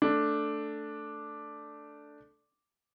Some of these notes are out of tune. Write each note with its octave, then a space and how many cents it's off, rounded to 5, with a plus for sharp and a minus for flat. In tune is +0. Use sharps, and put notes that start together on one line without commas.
A3 +0 D4 +0